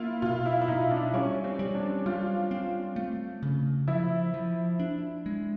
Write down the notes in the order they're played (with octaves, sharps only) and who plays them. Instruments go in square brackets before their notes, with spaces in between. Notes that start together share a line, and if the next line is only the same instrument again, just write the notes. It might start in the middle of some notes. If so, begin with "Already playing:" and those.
Already playing: [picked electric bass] A#3 [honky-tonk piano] E4 F4
[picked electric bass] B2 [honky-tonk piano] F4
[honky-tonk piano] E4
E4
[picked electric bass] B2 [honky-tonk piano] D#4
[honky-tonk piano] D4
[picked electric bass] G3 [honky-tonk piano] C#4
[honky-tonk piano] C4
[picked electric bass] G3
[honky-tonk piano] D4
[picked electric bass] G3 [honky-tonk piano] F4
[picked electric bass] C4
A3
C#3
[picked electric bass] F3 [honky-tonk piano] E4
[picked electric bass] F3
D4
G#3